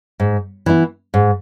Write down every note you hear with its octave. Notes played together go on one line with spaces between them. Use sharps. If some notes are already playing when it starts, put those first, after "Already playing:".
G#2
E3 B3 E4
G#2